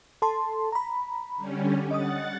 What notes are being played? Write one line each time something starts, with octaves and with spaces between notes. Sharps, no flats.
A4 A5 C6
A#5 B5
D3 G3 C#4
D#5 F#5 D#6 A6